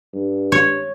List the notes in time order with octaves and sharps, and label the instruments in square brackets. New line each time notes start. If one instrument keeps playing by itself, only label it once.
[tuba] G2
[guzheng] C#5